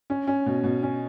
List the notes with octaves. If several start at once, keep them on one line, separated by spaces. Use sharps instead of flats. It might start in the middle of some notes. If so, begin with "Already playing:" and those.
C#4
C#4
B2
B2
C#4